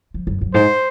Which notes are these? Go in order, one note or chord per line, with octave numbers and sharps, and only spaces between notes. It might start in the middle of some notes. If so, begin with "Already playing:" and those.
F3
F#2
F#2
G#2 C5